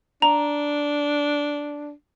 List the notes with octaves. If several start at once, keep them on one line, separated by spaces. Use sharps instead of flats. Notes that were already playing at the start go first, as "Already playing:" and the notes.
D4 A#5